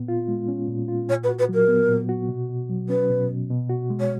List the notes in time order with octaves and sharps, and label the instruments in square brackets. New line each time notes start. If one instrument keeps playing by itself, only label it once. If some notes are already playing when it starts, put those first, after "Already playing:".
Already playing: [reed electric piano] A#2 B3
F4
G#3
C#4
A#2
F4
[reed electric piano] A#2 [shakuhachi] C#5
[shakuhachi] B4
[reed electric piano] F#4
[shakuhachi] B4
[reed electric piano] F#3 [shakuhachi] A#4
[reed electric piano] B3
A#2
F#4
B2
B2
F#3
[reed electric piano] C#4 [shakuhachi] B4
[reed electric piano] B2
B2
B2
F#4
G#3
[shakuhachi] C#5